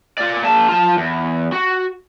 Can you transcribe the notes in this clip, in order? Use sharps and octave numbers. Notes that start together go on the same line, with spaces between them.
F4 D5
A#3 A5
F4 A5
E2
F#4